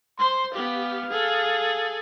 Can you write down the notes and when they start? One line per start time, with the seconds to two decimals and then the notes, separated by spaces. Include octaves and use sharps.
0.19 C5 C6
0.54 B3 G4 F5
1.09 G#4 A4